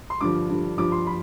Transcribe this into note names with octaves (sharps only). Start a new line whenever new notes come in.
C6
G2 D3 F3 D6
G2 D3 F3
G2 F3 D6
C6
F3 B5